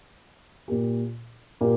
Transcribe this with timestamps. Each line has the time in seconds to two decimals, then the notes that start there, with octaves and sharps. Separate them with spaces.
0.68 A#2 A#3 G4
1.61 A#2 A#3 G4